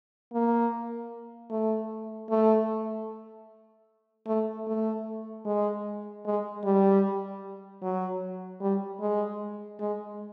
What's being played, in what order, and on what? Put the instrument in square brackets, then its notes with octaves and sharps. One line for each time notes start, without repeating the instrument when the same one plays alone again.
[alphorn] A#3
A3
A3
A3
A3
G#3
G#3
G3
F#3
G3
G#3
G#3